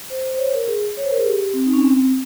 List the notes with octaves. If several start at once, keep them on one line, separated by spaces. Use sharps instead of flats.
C5
C5
C#5
A#4
G#4
C#5
C5
A#4
G#4
G4
C4
D#4
C#4
C4